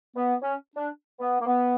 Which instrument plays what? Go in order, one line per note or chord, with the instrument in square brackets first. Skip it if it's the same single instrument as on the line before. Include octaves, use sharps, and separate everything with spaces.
[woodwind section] B3
C#4
D4
B3
A#3
B3